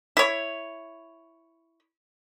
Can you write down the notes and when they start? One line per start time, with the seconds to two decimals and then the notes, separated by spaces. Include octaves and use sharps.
0.17 E4 C#5